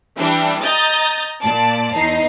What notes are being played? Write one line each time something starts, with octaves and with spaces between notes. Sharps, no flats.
E3 G3 D4
D#5 A#5 D#6 G6 A6
A#2 D5 A5
E2 D#4 C7